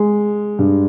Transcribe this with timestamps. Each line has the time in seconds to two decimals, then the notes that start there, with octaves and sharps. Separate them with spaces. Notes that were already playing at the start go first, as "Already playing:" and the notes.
Already playing: G#3
0.59 G2